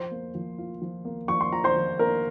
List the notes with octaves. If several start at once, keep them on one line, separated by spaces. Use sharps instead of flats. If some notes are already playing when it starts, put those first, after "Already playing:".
Already playing: F3 C5 C6
A#3
F3
F4
F3
A#3
F3 C#6
C6
F4 A#5
C5 C6
F3
A#3 A#4 A#5